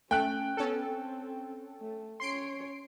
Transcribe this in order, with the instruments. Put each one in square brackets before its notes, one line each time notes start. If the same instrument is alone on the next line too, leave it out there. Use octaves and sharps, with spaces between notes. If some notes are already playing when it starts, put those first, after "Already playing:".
[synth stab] A3 [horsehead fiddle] C#4 [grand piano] G5 F#6
[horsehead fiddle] B3 [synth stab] C#4 A4
[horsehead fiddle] C4
A3
[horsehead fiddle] C#4 C#5 [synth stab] C6 C7 D7